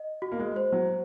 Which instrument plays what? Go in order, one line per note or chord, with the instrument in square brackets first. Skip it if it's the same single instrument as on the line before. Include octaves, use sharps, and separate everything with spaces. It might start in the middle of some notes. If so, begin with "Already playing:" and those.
Already playing: [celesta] D#5
F#4
[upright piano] A#3
G#3
[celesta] C5
[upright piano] F#3